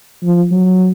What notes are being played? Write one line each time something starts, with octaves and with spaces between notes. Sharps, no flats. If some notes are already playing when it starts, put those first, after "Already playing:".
F3
F#3